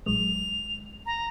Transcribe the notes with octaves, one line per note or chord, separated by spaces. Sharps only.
A1 F#3 G#3 F7
A#5